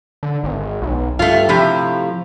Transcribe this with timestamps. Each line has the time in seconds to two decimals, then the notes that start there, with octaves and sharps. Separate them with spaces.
0.23 D3
0.43 G#1
0.82 B1
1.19 G2 A3 F4
1.49 A2 C3 F3 G4